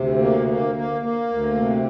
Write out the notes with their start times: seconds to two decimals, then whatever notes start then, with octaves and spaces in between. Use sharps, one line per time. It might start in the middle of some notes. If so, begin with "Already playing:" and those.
Already playing: D2 C3
0.19 A#3
0.47 A#3
0.75 A#3
1.02 A#3
1.29 D2
1.56 C3